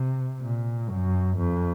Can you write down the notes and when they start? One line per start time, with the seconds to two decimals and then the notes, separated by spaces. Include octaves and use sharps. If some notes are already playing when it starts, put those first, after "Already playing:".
Already playing: C3
0.41 A#2
0.90 F#2
1.38 F2